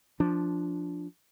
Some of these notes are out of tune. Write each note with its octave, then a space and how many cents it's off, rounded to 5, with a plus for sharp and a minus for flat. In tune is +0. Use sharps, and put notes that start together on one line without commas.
F3 +0 D4 +0